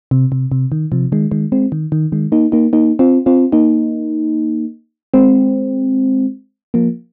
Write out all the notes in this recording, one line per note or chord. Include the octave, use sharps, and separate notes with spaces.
C3
C3
C3
D#3
C3 F3
D#3 G#3
D#3 G#3
G#3 C4
D#3
D#3
D#3 G#3
A#3 D#4
A#3 D#4
A#3 D#4
C4 F4
C4 F4
A#3 D#4
G#3 C4
F3 A#3